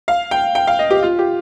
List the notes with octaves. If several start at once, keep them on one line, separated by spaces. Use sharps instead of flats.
F5
G5
G5
F5
D#5
G4
F4
G4